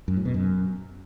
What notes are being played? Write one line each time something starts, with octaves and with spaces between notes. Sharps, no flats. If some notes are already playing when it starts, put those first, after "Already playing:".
F#2
A2
B2
F#2